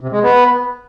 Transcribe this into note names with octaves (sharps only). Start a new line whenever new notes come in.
C3
G#3
B3